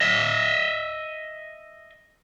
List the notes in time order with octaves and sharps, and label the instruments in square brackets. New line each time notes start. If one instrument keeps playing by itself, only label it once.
[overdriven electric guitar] D#5 E5